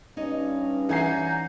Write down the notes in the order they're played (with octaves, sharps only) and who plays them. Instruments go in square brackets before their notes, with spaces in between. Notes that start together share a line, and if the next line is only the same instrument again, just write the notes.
[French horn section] G2 C#4 [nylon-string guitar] D#4 C#5 D#5
[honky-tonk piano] E3 G#5 C7 [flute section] F#5 A#5 G6